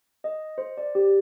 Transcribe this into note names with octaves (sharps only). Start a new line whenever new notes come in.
D#5
C5
D5
G4